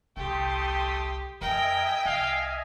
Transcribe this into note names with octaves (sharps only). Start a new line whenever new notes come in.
G1 C2 A3 G4 G5 C6 D#6
F2 A#4 D#5 E5 G5 G#5
C2 F5